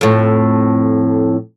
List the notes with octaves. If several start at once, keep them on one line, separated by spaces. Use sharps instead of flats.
F2 A2